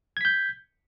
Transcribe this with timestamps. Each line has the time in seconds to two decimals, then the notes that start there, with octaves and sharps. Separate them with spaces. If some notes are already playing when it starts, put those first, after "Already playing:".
0.17 G#6
0.21 B6
0.25 G6